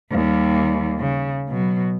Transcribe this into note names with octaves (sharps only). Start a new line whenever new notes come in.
D#2 G3
C#3
B2 F#3